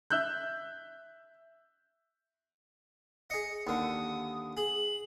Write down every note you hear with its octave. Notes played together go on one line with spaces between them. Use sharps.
E5 E6 F#6 G6
G#4 D#5 C#7
D#2 D3 D#6
G#4 F#7